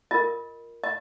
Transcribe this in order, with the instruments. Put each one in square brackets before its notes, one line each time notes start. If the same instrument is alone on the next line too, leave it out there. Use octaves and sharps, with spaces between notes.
[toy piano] F4 A#4 D#5
D#5